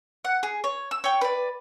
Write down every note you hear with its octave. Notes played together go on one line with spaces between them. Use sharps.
F#5
G#4
C#5
E6
C#5 G5
B4 D5